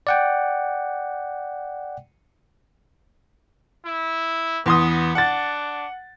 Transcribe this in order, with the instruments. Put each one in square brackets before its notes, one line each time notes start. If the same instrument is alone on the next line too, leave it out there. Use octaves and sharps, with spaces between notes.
[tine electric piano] D5 F#5 G5
[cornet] E4
[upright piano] E2 C6 D#6 [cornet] B3
[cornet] D4 [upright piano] F#5 A6